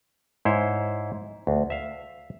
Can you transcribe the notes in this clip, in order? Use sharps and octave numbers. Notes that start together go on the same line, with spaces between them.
G#2 E4 C5 C#5
D2
E5 F5